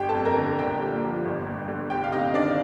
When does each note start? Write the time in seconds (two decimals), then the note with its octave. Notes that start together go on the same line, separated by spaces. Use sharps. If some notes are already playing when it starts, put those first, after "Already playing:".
Already playing: G1 G4 G5
0.09 A4 A5
0.14 F2
0.25 A#4 A#5
0.37 D3
0.58 C2 G4 G5
0.80 A#2
1.02 F3
1.25 G1
1.47 G2
1.68 D3
1.90 C2 G4 G5
2.04 F5
2.12 C3 D#4 D#5
2.34 D#3 D4 D5